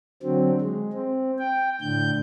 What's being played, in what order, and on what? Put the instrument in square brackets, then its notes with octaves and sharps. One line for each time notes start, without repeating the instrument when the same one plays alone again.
[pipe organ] D3 F#3 C4
G#3
C4
G5
A2 D3 G6